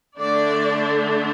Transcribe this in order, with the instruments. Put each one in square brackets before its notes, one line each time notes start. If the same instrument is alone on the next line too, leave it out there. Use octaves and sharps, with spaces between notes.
[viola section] D3 A3 D4 D5